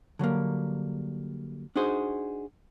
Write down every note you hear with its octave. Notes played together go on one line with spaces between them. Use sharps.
D3 F#3 G3 A#3
D4 D#4 F#4 G#4 C5